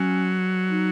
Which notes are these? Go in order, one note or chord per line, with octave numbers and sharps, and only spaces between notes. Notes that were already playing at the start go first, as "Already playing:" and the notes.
Already playing: F#3 C#4
D#4